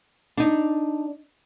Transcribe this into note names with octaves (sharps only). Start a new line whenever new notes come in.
D4 D#4